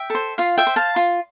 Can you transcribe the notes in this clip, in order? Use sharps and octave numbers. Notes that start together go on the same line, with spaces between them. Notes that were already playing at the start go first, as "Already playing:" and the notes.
Already playing: E5 G5
A4 C5
F4 F5
E5 G5
C5
F5 A5
F4